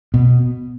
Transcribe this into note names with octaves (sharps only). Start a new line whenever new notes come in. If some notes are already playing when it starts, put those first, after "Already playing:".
B2